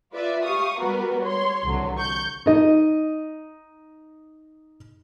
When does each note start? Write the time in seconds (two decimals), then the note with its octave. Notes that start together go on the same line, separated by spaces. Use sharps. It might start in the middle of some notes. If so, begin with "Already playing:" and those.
0.13 F4 B4 D5 E5
0.44 G4 F5 C#6 D#6
0.79 G3 B3 F#4 A#4 B4
1.22 C#5 C6
1.65 C2 D3 E3 F#3
1.97 C#6 G6
2.46 D#4 D#5